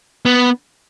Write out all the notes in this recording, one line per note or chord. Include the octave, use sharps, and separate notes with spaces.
B3